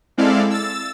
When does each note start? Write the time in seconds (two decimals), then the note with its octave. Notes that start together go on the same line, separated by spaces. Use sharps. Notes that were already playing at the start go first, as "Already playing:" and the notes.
0.17 G#3 C4 E4 A4 D5 F5
0.50 E6 A6